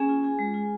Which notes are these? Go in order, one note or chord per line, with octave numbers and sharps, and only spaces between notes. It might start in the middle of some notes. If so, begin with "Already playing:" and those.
Already playing: A#3 C#4 G#4 G#5
F4
F4 G#4 G#5
G#3
F4